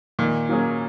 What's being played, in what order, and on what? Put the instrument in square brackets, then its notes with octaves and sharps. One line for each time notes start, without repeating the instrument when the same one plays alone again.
[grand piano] A#2 [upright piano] D#3
[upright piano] F#3 A#3 C#4 G#4